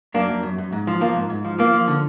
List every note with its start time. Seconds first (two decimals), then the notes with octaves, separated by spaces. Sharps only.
0.14 F#2 A#3 D4
0.29 F#2
0.43 F#2
0.58 F#2
0.72 G#2
0.87 F3
1.01 F3 A#3
1.16 G#2
1.30 G#2
1.45 F3
1.59 F3 A#3
1.73 F3
1.88 D3